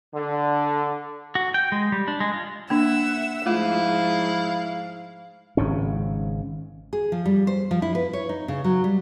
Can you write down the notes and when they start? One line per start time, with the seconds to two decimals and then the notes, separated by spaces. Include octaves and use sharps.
0.14 D3
1.35 F#4
1.54 G5
1.72 G#3
1.92 G3
2.08 D4
2.20 G#3
2.33 F4
2.70 A#3 D4 E5 F#5 E6
3.46 G#2 F3 A3 E4 F4 F5
5.57 G#1 G#2 C#3 C#4
6.93 G#4
7.12 F3
7.25 G3
7.47 C5
7.71 F3
7.82 E4
7.95 B4
8.13 C#5
8.29 D#4
8.48 C#3
8.64 F#3
8.84 G3